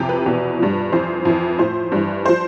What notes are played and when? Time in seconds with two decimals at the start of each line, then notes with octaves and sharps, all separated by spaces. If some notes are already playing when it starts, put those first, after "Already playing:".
Already playing: F2 C3 E3 G4
0.09 B4
0.26 E2 B2
0.59 G2 F3
0.92 F2 E3 C5
1.25 F2 E3
1.59 A2 F3 C5
1.92 G2 E3
2.25 F3 C5